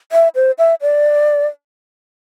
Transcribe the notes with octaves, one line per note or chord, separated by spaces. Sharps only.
E5
C5
E5
D5